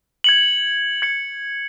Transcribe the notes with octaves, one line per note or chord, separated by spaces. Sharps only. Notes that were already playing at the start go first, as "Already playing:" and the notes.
G#6 C#7 F#7
G#6 C#7 F#7